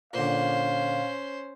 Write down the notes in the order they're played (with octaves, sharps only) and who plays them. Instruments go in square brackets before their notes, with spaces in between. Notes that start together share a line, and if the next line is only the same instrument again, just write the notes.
[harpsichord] A#2 D3 [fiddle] C#4 C5 [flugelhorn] F5